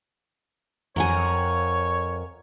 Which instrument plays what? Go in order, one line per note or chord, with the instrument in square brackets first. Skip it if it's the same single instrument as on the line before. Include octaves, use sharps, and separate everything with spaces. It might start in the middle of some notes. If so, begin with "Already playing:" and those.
[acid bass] F2 [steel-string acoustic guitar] A#4 F#5 G#5 [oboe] C#5